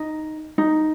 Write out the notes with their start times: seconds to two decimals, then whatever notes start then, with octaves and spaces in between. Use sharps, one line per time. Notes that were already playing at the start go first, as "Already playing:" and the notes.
Already playing: D#4
0.58 D#4